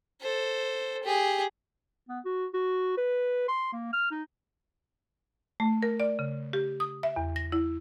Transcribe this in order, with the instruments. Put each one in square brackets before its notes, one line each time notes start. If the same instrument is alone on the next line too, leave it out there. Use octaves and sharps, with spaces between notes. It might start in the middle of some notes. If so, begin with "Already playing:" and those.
[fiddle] A4 C5
G4 G#4
[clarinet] B3
F#4
F#4
B4
C6
A#3
F6
D#4
[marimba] A3
A#4
D5
C#3
G4
D#6
E5
E2
A#6
E4